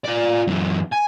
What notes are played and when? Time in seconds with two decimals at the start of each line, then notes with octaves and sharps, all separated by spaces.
0.04 F4 D5
0.47 F#2 E3
0.92 G#5